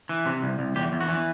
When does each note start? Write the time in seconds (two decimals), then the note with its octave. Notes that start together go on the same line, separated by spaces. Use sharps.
0.09 E3
0.26 C3
0.42 C2
0.59 C2
0.76 E2 G4
0.92 E2
1.01 F#4
1.08 E3